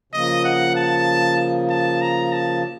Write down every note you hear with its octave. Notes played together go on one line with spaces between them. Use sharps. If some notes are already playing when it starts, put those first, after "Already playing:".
C#3 F3 A#3 D#5
F#5
A5
A5
A#5
A5